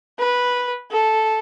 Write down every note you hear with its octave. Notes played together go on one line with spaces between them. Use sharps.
B4
A4